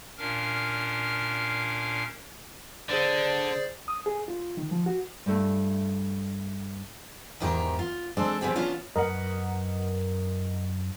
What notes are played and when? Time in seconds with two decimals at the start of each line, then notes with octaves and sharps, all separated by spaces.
0.18 A#2 C#4 D4 A#4 F5 F6
2.89 D3 G#4 C5 D5
3.88 D#6
4.06 G#4
4.28 F4
4.57 D#3
4.71 F3
4.86 F#4
5.26 G2 A3
7.40 E2 G#2 D#3 G4 A#4
7.79 F4
8.17 G#3 C4 D4 A4 C5
8.41 F3 B3 C4 G4 G#4
8.56 B3 C#4 D4 F4
8.96 F#2 A#4 B4 D#5 F#5